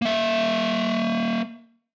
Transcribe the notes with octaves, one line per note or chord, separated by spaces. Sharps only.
A#3 E5